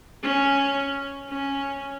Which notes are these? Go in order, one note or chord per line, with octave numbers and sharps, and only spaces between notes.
C#4
C#4